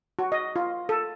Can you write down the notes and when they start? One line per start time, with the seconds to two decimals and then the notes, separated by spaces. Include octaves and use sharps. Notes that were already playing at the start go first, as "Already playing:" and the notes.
0.19 F#4
0.32 D#5
0.56 F4
0.89 A4